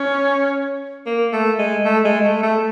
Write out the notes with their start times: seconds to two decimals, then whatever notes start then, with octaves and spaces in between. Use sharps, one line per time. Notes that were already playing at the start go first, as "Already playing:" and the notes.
Already playing: C#4
1.06 A#3
1.33 A3
1.59 G#3
1.85 A3
2.05 G#3
2.24 A3
2.43 A3